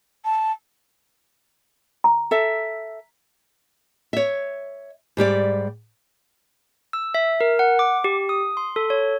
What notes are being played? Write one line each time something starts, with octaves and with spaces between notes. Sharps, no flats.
A5
A#5
A4 E5
C#5 E5
G#2 G3 G4 D5
E6
E5
A#4
F#5
D6
G4
D#6
C6
A4
C#5